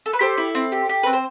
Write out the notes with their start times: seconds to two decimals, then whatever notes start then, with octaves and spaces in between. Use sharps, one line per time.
0.06 A4
0.13 B4
0.20 G4 A4 C5
0.38 E4
0.55 C4
0.72 G4
0.89 G4
1.03 C4 B4
1.13 C5